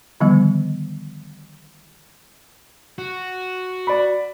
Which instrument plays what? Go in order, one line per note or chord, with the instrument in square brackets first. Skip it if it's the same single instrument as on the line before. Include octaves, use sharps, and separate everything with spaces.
[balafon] D3 D#3 F3 G3 B3 D#5
[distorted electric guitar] F#4
[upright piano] D5 B5